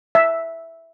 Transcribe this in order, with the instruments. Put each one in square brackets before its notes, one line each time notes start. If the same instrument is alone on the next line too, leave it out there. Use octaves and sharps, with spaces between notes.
[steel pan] E5